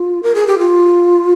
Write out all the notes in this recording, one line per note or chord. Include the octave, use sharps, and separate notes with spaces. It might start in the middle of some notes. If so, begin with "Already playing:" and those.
Already playing: F4
A#4
G#4
G4
F4